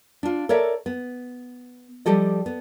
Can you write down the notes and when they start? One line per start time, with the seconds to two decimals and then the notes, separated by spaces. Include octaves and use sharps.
0.23 D4 F4
0.49 A4 A#4 C#5 D5 E5
0.86 B3
2.06 F3 G3 G4 A4 D#5
2.46 B3